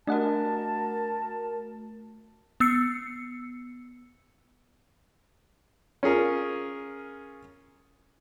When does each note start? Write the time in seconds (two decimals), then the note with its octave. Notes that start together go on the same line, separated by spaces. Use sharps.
0.07 A3 D4 F#4 A#4 D#5 F#5 A5
2.60 B3 E6 C7 C#7
6.03 C#4 F4 G#4 A#4